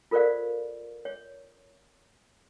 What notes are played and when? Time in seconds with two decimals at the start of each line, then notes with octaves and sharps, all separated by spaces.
0.11 F4 A4 A#4 C5 D5 F5
1.05 C#5